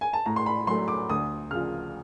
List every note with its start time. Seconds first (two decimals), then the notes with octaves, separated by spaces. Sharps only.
0.01 G#5
0.13 A5
0.26 A2 A#5
0.36 C6
0.46 B5
0.67 F#3 C6
0.71 A3
0.88 D6
1.09 D2 D#6
1.51 C#3 F3 F6